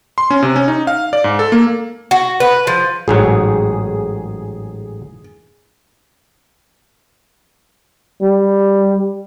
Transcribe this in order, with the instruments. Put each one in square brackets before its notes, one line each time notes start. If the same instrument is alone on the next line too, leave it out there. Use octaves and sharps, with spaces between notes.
[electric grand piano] C6
C#4
C3
C#4
D#4
F5
D5
G#2
A4
A#3
[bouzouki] F#4
B4
F3
[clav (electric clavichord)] A1 G#2 F#3 [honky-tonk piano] G#4
[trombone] G3